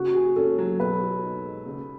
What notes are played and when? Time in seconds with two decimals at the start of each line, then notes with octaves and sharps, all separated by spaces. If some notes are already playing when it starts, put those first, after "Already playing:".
Already playing: C#3 F#4
0.14 G#4
0.36 C#4 A4
0.58 F#3
0.79 B2 B4
1.01 F#4
1.23 D#4
1.45 G#3
1.66 C#3